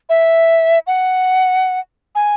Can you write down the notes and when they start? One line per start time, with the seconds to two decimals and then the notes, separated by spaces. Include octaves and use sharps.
0.09 E5
0.87 F#5
2.15 G#5